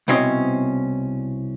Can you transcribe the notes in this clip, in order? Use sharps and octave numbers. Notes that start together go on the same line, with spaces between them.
C2 B2 C4 C#4 D#5